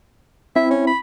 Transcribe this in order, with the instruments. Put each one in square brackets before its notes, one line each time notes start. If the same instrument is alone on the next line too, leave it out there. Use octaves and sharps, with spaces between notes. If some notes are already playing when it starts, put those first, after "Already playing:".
[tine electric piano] C4 E4 [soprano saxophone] E5
[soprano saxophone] C#4
B5